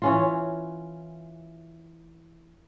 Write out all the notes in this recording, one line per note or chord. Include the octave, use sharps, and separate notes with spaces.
E3 C#4 F4